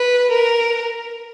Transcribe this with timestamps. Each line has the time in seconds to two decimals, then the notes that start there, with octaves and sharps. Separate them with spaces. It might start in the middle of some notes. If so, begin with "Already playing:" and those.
Already playing: B4
0.31 A#4